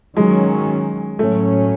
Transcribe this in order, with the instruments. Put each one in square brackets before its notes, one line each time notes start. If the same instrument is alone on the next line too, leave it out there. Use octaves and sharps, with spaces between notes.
[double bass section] D#3 F#3 C#4 [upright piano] G#3
[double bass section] A2 F#3 C#4 [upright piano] A3